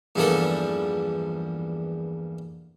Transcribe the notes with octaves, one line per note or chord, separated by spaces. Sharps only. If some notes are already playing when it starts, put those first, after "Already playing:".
E2 G2 F3 G3 A#3 A4